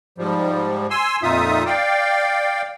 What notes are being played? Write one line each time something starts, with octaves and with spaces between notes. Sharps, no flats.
G#2 F3 G3
G#5 C6 E6
F2 A#2 D#4 F4 E5 D#6
D5 F5 G5